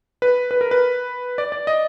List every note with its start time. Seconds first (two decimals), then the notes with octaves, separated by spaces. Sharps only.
0.22 B4
0.51 B4
0.61 A#4
0.71 B4
1.38 D5
1.52 D5
1.67 D#5